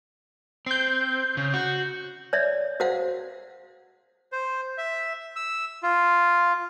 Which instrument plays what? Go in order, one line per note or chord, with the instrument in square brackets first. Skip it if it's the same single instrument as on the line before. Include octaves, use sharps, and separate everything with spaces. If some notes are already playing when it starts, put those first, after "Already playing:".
[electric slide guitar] C4 [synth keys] G6 C7
[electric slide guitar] C#3
F#4
[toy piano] C#5 D5 E5
F#4 C5 F5 F#5
[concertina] C5
E5
E6
F4